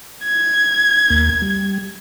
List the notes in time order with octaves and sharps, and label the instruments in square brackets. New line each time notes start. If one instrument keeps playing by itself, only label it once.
[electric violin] G#6
[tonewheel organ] D#2 A#3
G3